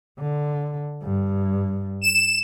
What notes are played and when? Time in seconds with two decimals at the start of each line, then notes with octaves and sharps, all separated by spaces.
0.19 D3
1.03 G2
2.02 E7